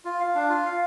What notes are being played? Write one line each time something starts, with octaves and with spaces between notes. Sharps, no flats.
F4
F5
D4
F4
F5